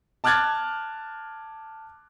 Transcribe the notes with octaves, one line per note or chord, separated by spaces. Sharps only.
A5 D6 F6 F#6 G#6 A6